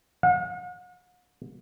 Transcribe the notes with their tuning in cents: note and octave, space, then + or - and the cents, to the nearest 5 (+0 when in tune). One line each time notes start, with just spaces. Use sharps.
F#5 -45